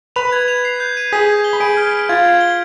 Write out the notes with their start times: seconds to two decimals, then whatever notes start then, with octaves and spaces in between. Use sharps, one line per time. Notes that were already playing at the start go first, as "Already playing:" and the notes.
0.16 B4 B5 F7
0.32 G#6
0.48 F7
0.65 C7
0.80 G6
0.97 D#7
1.12 G#4 G#5 B6
1.29 B6
1.44 G7
1.53 B5
1.60 G#4 G#5 D7
1.77 F6
1.94 D7
2.09 F4 F5 G#6
2.25 G#6
2.41 G7